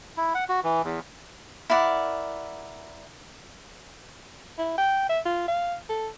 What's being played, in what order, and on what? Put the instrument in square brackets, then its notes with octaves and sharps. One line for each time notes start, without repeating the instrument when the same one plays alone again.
[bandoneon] E4
F#5
F#4
E3
E2
[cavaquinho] E4 A#4 D5 F#5
[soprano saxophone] E4
G5
E5
F4
F5
A4